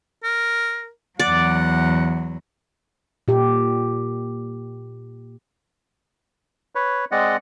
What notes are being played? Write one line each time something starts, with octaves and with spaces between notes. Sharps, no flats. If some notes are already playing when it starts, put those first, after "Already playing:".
A#4
E2 F#3 D5 F#5
A#2 G4
B4 C#5
G#3 C4 D5 D#5 F#5